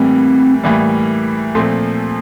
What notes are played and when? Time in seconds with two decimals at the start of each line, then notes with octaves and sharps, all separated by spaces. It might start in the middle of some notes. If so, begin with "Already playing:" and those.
Already playing: A2 E3 G3 A#3 C4
0.63 A2 E3 G3 A#3
1.55 A#2 F3 A3 C4